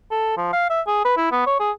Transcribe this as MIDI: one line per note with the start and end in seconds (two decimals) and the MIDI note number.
0.11 0.33 69
0.37 0.49 53
0.53 0.66 77
0.70 0.81 76
0.87 1.00 68
1.05 1.15 71
1.17 1.29 64
1.32 1.44 59
1.46 1.55 73
1.60 1.71 68